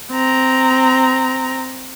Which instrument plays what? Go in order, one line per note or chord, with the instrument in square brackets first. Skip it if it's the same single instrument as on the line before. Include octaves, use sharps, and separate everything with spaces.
[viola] C4 A#5